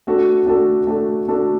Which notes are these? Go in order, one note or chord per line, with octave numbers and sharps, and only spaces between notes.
A3 D4 F#4 A4
A3 D4 F#4 A4
A3 D4 F#4 A4
A3 D4 F#4 A4